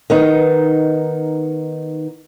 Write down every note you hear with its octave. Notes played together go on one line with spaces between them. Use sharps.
D#3 B3 D#4